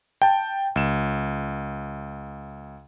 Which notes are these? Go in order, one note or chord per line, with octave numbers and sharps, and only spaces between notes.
G5 A5
C#2 E7